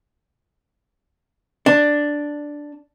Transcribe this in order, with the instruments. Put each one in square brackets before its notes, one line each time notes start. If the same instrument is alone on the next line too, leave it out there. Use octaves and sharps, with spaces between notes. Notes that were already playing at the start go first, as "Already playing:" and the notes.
[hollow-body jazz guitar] D4